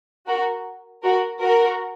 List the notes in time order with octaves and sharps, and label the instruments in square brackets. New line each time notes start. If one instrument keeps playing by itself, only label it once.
[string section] F#4 A#4
F#4 A#4
F#4 A#4